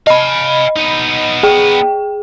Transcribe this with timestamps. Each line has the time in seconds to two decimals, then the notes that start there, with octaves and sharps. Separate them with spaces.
0.07 D#5 F5 G#5 B5
0.76 B3 D#4
1.43 G#4 G5